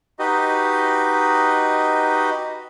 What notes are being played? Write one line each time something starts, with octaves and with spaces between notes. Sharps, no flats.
D#4 F#4 G4 B4 D#5